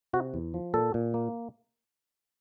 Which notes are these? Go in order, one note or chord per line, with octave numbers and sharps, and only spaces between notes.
C3 F#4
E2
F3
A#2 A4
A#2
A#3